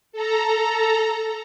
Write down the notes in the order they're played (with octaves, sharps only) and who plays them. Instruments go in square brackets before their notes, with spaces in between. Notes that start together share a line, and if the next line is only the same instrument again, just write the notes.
[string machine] A4 A#5